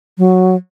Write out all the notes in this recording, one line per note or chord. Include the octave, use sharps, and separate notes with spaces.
F#3